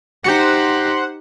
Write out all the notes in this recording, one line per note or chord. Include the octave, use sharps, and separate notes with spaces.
D#4 G4 C5 F#5